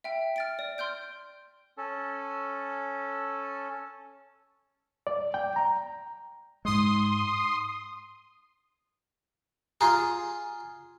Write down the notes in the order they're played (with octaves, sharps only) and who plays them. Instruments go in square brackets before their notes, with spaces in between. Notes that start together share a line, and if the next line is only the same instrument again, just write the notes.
[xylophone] E5 G5
F6 A6 D7
D5
C6 F6 G6 D7
[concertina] C#4 A4
[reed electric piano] D5
G5
A#5
[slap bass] G#2 G#3 [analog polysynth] C6 D#6
[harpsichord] F4 G#4 [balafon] A#5